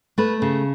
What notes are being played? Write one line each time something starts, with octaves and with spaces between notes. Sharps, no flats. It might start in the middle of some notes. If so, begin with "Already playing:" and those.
A3 B4
C#3